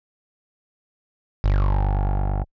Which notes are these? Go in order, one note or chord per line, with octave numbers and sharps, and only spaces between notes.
G1